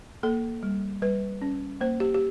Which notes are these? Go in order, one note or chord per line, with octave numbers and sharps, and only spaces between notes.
A#3 A4
G3
G3 B4
C#4
A#3 C5
G4
G4